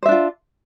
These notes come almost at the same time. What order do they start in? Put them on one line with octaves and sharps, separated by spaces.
C5 E5 D4 F4